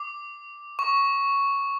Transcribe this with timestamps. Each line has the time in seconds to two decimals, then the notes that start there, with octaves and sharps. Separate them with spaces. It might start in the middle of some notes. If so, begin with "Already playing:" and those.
Already playing: D6
0.79 C#6